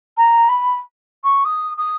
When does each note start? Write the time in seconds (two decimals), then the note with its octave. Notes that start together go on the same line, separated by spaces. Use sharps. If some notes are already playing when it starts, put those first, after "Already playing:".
0.17 A#5
0.49 B5
1.24 C#6
1.45 D#6
1.78 D#6